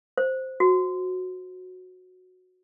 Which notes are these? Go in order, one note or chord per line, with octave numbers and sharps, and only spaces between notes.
C5
F#4